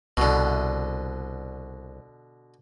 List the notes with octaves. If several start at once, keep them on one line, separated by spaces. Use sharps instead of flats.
C2 B2 D3